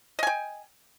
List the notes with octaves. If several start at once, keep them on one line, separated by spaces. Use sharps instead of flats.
D#5 G5 G#5